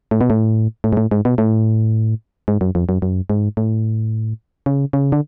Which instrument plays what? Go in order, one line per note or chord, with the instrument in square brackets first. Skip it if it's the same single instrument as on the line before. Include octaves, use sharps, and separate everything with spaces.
[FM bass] A2
B2
A2
A2
G#2
A2
G#2
B2
A2
G#2
F#2
F2
F#2
F#2
G#2
A2
C#3
C#3
D3